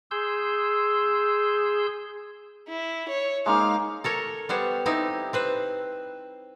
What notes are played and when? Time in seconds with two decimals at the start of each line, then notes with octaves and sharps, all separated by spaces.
0.11 G#4 C6 E6 G6
2.68 E4
3.09 C#5
3.46 G#3 A#3 D#4 F5
4.04 A4 A#4 C#5
4.49 G3 B3 G4 C5 C#5
4.86 C4 D#4 E4 G4
5.33 C4 B4 C5